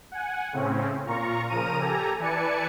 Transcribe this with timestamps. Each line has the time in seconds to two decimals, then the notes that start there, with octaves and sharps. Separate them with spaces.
0.12 F#5 G#5
0.52 A2 C#3 C4 C#4
1.06 A#2 F4 A#5 C#6
1.49 A#2 C#3 F3 A#4 A#5 D#7
1.80 G4 A4 G#5 A#5
2.19 E3 B4 D5 G#5 A5 C#7